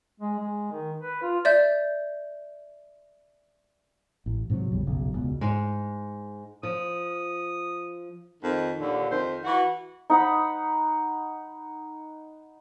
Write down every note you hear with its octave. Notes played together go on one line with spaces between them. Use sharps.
G#3
G#3
D#3
B4
F4
D5 E5 G6
A1
G#2 C3 E3 F#3
B1 F2 C#3 G3
F#1 B1 C#3
E1 C#2 B2
G#2
F3 D#6
F2 D#3
D#2 A#2 D3
F2 D#3 C5
E3 F#4
D#4 F#5 B5